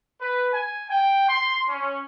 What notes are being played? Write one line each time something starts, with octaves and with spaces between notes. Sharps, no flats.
B4
G#5
G5
C6
C#4